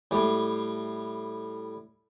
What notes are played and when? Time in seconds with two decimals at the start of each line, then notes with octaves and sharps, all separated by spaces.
0.11 A2 G3